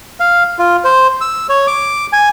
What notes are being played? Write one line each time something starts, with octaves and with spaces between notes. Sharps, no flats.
F5
F4
C5
E6
C#5
D6
G#5